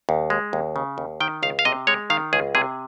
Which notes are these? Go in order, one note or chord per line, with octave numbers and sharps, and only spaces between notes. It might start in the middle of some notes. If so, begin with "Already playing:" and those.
D#2
G#3
D#2
C#3
D#2
D#3 G5
C#2 F5
F5
C3 D#5
G#3 C#5
D#3 F5
C#2 G#4
C3 G#4